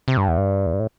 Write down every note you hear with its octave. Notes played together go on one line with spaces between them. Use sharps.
C3
G2
E2
G2
E2
G2
A2